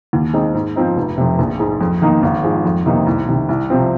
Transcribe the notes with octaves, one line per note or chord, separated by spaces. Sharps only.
D#2
D#3 G#3 C4 D#4
G#2
F3 C4 D#4
F1
F2 C3
A#1
G#2 G#3
F2
D#3 A#3 D#4
G#1
G#2 F3 G#3
F2
C3 D#3 A#3 D#4
C2
C3 D#3
C2
C3 F3 C4